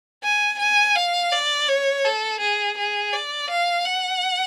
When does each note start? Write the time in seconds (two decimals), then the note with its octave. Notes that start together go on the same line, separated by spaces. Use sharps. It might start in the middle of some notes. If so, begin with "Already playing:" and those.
0.23 G#5
0.59 G#5
0.95 F5
1.32 D5
1.69 C#5
2.05 A4
2.40 G#4
2.78 G#4
3.13 D5
3.50 F5
3.85 F#5